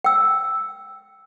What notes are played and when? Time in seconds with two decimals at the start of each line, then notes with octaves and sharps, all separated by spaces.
0.04 G5 E6